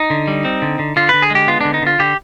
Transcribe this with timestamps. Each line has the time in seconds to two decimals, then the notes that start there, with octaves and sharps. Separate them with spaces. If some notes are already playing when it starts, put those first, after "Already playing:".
Already playing: D#4
0.10 D3
0.27 G3
0.45 C4
0.62 D3
0.79 D3
0.96 D3 F4
1.09 D3 B4
1.22 G#4
1.30 G#3 G4
1.48 B3 F4
1.61 D3 D4
1.74 D#4
1.82 D3 F4
1.99 D3 G4